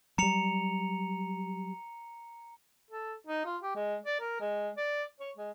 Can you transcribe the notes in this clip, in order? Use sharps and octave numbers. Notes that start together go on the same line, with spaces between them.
F#3 G3 A#5 C#7 F7
A4
D#4
F4
G4
G#3
D5
A#4
G#3
D5
C#5
G#3